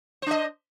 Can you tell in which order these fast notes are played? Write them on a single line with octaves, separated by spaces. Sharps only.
C5 D4 D#5